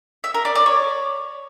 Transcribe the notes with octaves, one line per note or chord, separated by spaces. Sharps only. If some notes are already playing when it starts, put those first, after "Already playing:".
E5
A#4
D5
D5
C#5